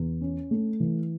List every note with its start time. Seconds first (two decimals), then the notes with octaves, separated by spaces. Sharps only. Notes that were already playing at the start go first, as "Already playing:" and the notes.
Already playing: E2
0.21 C#4
0.51 A3
0.80 E3